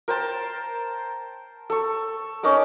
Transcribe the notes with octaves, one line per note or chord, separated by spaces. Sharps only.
A#4 C5 G5 A5
A4 C#6
C#4 D#4 A#4 D6